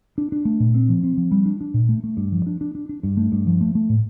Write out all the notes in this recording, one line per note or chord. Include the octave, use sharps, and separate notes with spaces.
D4
D4
A3
A#2
C4
F3
C4
F3
G3
D4
D4
A#2
A3
A3
G2
F3
D4
D4
D4
D4
G2
A3
G2
F3
A3
A3
A2